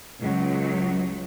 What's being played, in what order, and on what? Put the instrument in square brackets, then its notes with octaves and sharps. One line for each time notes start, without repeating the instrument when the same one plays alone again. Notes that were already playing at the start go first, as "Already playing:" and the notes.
[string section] C#2 F#3